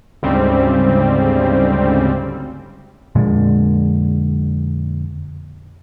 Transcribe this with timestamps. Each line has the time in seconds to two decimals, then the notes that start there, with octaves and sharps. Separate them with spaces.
0.23 D2 G#2 C#3 G3 C4
3.15 F2 A#2 D3 G#3